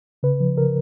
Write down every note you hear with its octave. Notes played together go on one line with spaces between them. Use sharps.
C#3 B4
F3
C#3 A#4